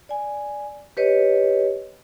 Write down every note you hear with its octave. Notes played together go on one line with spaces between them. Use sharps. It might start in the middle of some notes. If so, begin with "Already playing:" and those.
D5 G#5
G4 B4 C#5 D#5